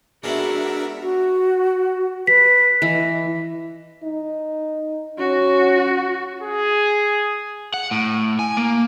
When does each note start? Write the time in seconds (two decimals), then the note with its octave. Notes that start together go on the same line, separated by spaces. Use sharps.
0.24 G#3 B3 D4 E4 F#4 A#4 E5
1.01 F#4
2.27 B4 B6
2.82 E3 D#5
4.03 D#4
5.19 C#4 F#4
6.43 G#4
7.74 F#5
7.91 A2
8.39 G#5
8.57 A#3